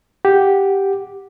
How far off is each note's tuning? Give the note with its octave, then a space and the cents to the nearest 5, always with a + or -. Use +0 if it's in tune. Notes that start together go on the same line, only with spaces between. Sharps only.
G4 +0 F#5 +0